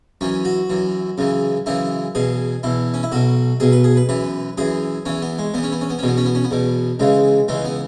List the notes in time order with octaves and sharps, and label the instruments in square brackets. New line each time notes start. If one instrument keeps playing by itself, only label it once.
[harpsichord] F#2 E3 C#4
F#4
F#2 E3
F#2 C#3 E3
F#2 C#3 E3 E4
E2 B2 G#4
E2 B2 E4
C#4
E4
B1 B2 F#4
B1 B2 G#4
B4
G#4
B4
F#2 E3 B4
F#2 E3 G#4
E2 E3 C#4
B3
G#3
E2 E3 B3
C#4
B3
C#4
B3
C#4
E2 B2 B3
C#4
B3
C#4
B3
E2 B2
C#2 C#3 E3 G#3
C#2 C#3 E3 G#3
B3